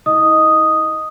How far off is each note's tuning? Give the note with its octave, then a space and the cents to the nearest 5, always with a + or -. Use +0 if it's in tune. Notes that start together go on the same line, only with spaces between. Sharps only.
E4 -45 D#5 +0 D#6 +0